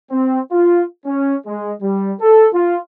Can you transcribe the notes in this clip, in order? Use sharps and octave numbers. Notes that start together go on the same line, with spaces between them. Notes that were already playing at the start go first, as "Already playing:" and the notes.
C4
F4
C#4
G#3
G3
A4
F4